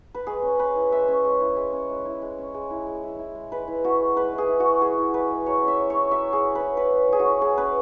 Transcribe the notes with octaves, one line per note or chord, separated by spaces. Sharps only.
B4
G#3 G#4
C#4
G#3 B4
E4
G#3 E5
C#4
G#3
E4
G#3
C#4
G#3
E4
G#3
C#4
G#3
E4
G#3
E4
E4
G#3
G#3 B4
E4
E4 F#4
G#3
G#3 B4
E4
G#4
E4
F#4
G#3
G#3 G#4
E4
E4 B4
G#3
F#3 C#5
C#4
E5
F#3
C#5
E4
F#3 E5
C#4
G#4
F#3
B4
E4
F#3 B4
C#4
F#3 G#4
F#4
E4
F#3 G#4
C#4 B4